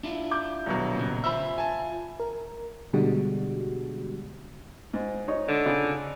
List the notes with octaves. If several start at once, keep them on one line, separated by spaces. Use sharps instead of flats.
D4 E4 F4
D6 G6
D#1 B2 F#3
A#2 C#3
F4 C5 E5 B5 E6
G#5 A5
A#4
B2 D3 G3 G#3 F#4
G#2
D#4 C#5
D3
C#3